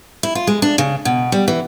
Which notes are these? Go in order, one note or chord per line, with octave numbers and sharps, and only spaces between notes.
E4
F4
G#3
D4
C#3
B2
G3
E3